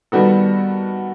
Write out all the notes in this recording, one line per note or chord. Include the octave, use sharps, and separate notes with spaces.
D#3 G3 B3 F#4 A4